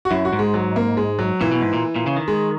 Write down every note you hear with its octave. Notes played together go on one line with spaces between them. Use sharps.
F#4
F#2 E4
F#4
G#2
G#3
F#3
A#3
G#3
F#3
A#2 E3
B2
G#2
A#2
A#2
C#3
D#3
G#3